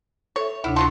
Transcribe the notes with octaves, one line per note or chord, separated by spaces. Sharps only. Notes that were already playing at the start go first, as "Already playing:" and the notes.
A4 C#5 E5
D2 C3 D4 E4
F#3 F4 A4 C6